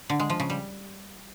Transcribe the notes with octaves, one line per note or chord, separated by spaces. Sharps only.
D3
G#3
F3
C#3
G3